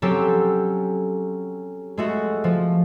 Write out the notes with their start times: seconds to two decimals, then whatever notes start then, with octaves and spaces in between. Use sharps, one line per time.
0.02 F#3 C4 C#4 G4 A4
1.97 G#3 A3 F#4
2.44 F3